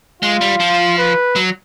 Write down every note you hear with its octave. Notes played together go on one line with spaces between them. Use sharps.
G#3 F4
G3
F3
B4
F#3